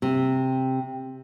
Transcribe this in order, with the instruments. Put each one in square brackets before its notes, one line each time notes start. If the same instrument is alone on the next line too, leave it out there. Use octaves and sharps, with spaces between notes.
[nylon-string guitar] C3